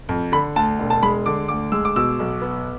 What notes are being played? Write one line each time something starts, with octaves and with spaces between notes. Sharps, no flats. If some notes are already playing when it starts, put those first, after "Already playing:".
F2
D3 B5
D2 A5
E1
A5
G#3 B5
D3 D6
D2 D6
G#3 E6
D6
B2 E6
B1
B3